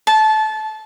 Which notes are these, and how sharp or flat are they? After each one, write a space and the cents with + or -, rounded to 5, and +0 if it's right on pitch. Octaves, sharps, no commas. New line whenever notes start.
A5 -20